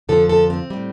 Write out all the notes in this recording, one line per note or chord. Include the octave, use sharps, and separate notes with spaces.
F2 D3 F3 A4
A4
C4
A2 G3